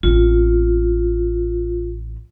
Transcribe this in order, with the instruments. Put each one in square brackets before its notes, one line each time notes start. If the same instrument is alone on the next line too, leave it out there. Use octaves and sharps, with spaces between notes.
[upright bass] A1 C4 [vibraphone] F4